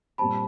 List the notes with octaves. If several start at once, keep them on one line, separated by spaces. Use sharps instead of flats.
A#2 G3 C4 A5 B5